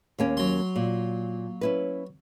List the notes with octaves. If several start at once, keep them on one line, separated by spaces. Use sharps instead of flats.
D#2 A#3 C#4
F#3 C6
A#2
C#4 E4 B4